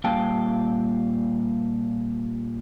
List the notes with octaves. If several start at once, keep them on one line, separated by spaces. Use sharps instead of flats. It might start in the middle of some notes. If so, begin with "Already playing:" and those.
A#2 G3 F5 G5 A5